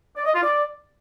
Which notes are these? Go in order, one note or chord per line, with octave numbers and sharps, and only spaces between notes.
D5
D#5
F4
D5